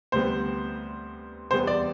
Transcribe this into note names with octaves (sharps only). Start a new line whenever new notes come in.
D2 C3 G3 B3 C5
E2 C3 G3 B3 C5
D5